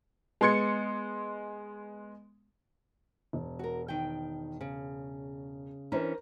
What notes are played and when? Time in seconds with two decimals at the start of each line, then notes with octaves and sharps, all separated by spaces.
0.41 G#3 B3 C6 G#6 C#7
3.33 E1
3.59 F#4 A#4
3.88 D#3 G5
4.61 C#3
5.92 E3 C#4 D4 A#4 C5 A#5